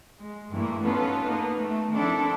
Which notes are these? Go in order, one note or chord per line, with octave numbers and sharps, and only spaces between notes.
G#3
G2 A#2 E3 A3 A#3 E4
B3 C#4 D#4 F4 A4 B4
A#3 B3 D#4
A3
D#3 F3 C4 D4 E4 A4